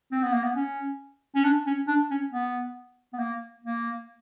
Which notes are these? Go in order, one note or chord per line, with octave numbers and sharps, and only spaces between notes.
C4
B3
A#3
B3
C#4
C#4
D4
C#4
D4
C#4
B3
B3
A#3
A#3